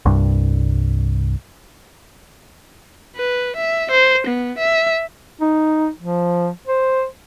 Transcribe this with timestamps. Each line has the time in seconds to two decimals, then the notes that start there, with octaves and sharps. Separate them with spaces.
0.06 C2 G2
3.16 B4
3.56 E5
3.91 C5
4.27 B3
4.58 E5
5.41 D#4
5.99 F3
6.67 C5